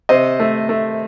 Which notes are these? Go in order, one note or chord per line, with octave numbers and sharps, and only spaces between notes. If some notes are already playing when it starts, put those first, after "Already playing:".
C3 C5 D#5
A3
A3